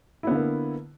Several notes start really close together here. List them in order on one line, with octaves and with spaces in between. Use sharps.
E4 B3 D3 A#3